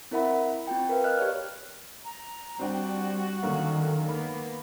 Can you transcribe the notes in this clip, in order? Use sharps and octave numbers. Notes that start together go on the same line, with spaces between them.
C4 E4 A#4 E5 F#5 B5
C4 F4 G5
A#4 B4 F5
D#5 F5 F6 F#6
G4 C#5 D5 F6
A#5
G3 C4 D4 F#4 G5
F#2 D3 D#3 A#3
A#3 B3 B5